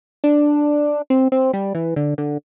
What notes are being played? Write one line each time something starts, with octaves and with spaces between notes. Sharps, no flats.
D4
C4
C4
G3
E3
D3
D3